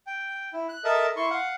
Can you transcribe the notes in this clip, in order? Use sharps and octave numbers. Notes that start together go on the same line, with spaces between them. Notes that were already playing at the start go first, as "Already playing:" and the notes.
G5
E4
F#6
A4 A#4 D#5 E5
E4 C6 C#6
F5 F#5